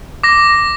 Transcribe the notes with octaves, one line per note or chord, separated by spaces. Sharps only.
D6 A#6
D6